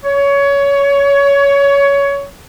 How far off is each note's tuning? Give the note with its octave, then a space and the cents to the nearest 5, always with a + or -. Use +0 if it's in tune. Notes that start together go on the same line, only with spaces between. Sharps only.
C#5 +20